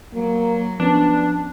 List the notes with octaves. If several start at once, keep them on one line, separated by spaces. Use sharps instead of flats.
F#3 A#3
F3 B3 C#4 D4